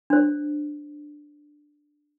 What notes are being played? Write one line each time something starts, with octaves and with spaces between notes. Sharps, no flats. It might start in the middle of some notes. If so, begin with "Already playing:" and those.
D4 C5